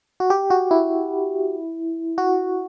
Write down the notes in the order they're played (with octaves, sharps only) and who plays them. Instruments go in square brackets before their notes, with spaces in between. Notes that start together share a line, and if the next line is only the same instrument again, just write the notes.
[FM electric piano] F#4
G4
F#4
E4
F#4